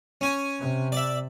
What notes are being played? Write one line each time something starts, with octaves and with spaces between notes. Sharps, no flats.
C#4 G#5
C3
D5 E5